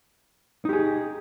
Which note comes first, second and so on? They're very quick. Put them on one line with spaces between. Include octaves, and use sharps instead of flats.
D#4 G4 G#4